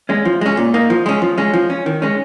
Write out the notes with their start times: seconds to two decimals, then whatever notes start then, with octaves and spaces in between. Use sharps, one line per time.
0.09 G#3 C#4
0.25 F3
0.41 G#3 C#4
0.57 A#2
0.74 A#3 D#4
0.90 F3
1.06 G#3 C#4
1.22 F3
1.38 G#3 C#4
1.53 F3
1.70 C#4
1.86 D#3
2.02 G#3 C#4